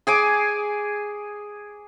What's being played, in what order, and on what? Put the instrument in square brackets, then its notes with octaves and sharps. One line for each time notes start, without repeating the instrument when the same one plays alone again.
[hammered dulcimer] G#4 G#5 D6